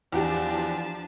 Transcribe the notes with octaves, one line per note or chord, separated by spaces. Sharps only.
E2 F3 D4 F#4 G4 A5